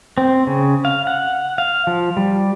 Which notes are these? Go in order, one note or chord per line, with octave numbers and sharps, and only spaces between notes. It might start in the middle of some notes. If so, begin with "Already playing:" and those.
C4
C#3
F5
F#5
F5
F3
G3